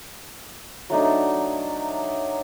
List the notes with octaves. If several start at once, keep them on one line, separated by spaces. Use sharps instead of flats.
F#3 A3 D4 D#4